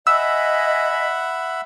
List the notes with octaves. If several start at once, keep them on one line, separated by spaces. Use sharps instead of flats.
D#5 E5 F#5 G#5 B5 E6